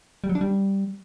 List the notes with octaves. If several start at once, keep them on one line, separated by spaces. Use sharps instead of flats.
G3
F#3
D4
G3